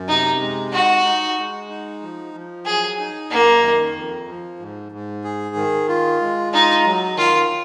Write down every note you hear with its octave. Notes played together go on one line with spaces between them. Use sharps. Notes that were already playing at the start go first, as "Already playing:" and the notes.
Already playing: F#2
C3 D#4
G#3
D#4 F#4
D#4
G#3
D#4
F3
F3
F#3 G#4
D#4
F#2 A#3
D#3
F2
F3
G#2
G#2
G#4
D#3
F4
G#3
D#4 F4
F#3
D#3 F4